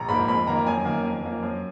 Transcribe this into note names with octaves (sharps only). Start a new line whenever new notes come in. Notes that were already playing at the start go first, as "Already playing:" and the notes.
Already playing: A#1 A#5
G#2 F3 A#3 B5
F2 B5
D#3 A#3 A#5
F#2 G#5
D#3 A#3
F2
F3 A#3
F#2